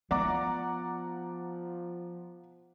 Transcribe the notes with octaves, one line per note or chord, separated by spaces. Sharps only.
F3 B3 D5 F#5 A#5 D6